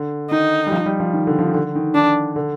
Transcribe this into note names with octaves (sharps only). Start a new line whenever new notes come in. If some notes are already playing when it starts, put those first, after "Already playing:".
Already playing: D3
D#3 D#4
G3
F3
G3
F3
D#3
D3
F3
D#3
D3
D#3
D#3 D4
D3